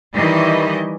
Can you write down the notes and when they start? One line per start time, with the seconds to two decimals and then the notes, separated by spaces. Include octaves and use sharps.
0.16 D#3 E3 G3 D#5